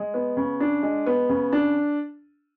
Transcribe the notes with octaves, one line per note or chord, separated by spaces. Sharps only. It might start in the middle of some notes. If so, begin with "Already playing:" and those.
Already playing: G#3
B3
C#3
D4
G#3
B3
C#3
D4